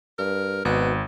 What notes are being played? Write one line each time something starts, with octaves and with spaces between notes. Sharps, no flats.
G2 A#4
G#1 B2 B3